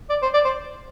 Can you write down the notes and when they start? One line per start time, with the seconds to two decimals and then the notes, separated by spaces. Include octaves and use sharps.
0.10 D5
0.22 C5
0.34 D5
0.45 C5